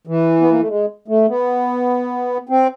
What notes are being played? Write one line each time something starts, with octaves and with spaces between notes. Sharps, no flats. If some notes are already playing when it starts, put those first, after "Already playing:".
E3
B3
A#3
A3
G#3
A3
B3
C4